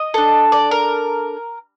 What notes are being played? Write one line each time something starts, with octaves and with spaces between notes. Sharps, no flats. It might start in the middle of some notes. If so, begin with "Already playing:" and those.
Already playing: D#5
D4 A4
D5
A#4